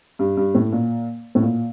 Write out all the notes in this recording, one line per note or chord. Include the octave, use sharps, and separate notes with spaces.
G2
G2
A2
A#2
A2
A#2